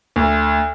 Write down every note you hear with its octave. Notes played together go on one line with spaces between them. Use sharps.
D2